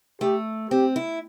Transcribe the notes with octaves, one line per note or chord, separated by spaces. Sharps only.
A3 G4
C4 G4
E4